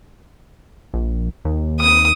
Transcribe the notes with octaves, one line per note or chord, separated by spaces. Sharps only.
A#1
D#2
D#6